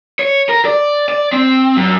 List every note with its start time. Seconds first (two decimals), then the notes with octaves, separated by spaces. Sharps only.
0.19 C#5
0.49 A#4
0.65 D5
1.09 D5
1.32 C4
1.76 F#2